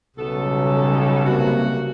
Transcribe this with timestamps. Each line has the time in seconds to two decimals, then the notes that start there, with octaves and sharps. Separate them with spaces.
0.19 B1 C#3 G3 B3 A4
1.25 C3 A#3 F#4